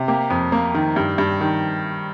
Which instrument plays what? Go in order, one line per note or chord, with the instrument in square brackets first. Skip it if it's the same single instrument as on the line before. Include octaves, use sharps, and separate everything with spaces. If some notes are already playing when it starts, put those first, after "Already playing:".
Already playing: [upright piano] C3
A#3 G4
F2
A#3
D#3
G2
G2
D#3